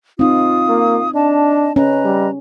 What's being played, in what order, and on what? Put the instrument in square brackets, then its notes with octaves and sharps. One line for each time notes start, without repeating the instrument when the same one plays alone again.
[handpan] C4 D#4 [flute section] F4 F5 D#6
[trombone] A#3
[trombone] D4 [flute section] D#5 A5
[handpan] C#4 [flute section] B4 D#5 A#5
[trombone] G3